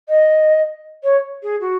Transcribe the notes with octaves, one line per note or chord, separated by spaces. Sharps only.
D#5
C#5
G#4
F#4